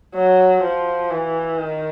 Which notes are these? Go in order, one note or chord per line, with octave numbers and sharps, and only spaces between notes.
F#3
F3
E3
D#3